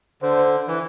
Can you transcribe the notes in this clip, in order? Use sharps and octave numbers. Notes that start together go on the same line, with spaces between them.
D3 C5
E3